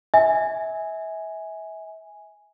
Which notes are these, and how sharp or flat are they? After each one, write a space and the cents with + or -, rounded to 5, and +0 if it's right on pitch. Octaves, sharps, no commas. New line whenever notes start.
E5 -30 G#5 +0